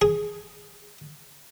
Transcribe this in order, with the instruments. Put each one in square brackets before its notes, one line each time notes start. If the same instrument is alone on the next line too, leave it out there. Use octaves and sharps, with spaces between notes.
[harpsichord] G#4